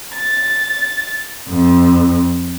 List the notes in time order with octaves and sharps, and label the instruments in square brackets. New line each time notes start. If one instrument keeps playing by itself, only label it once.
[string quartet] A6
F2